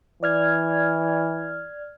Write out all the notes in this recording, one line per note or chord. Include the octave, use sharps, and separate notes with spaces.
E3 D5 F6 G#6